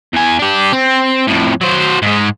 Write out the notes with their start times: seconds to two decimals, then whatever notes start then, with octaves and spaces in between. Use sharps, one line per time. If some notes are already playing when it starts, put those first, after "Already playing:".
0.13 E2 G#5
0.39 D4 G4
0.72 C4
1.27 F2 A2
1.61 F#3 C5
2.02 G#2 G#3